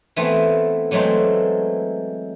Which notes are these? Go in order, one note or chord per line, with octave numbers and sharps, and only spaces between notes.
E3 A3 B3 C4
E3 F#3 G#3 A3 C4